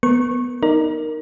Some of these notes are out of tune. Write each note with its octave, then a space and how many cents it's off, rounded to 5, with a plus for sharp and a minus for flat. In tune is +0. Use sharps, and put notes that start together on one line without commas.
B3 +0 A#4 -5 C#6 -20
D#4 +0 A#4 +0 D5 +0